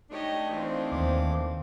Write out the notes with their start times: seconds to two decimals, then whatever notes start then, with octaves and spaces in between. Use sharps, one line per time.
0.11 A3 D4 D#4 G4 C#5 D#5
0.52 E3 F3 C4
0.92 D#2 D#3 D6